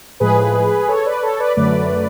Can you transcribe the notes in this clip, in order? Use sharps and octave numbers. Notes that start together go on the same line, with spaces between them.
A2 F3 G#3 G#4 B4
A4 C#5
B4 D5
A4 C#5
B4 D5
F#2 D3 F#3 A3 B4 D5